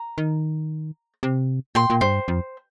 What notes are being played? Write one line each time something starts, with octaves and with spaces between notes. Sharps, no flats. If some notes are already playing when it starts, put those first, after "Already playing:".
Already playing: A#5
D#3
C3
A#2 G5 C6
A#2
G2 C5
F2